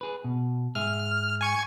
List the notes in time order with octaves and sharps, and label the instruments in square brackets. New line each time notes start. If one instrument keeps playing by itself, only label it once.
[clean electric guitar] G#4 B4
B2
[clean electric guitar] G#2 G#4 E5 [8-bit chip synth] F6
[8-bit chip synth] G#5 C#6 G#6